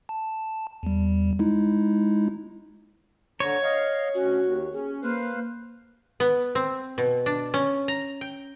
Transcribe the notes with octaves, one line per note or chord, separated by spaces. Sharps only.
A5
E2 G3
G#3 D#4 E4
D3 C#5 A#5
D#5 F5
D2 C#4 F#4
D#2
C#4 G#4
A#3 B4 C5 F5
B3
C4
B2
D4
C#4
A#5
G5